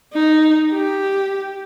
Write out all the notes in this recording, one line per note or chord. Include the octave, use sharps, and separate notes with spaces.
D#4
G4